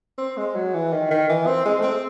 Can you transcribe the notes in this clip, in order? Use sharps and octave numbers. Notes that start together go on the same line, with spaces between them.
C4
G#3
F#3
E3
D#3
D#3
E3
C4
G#3
A3
C4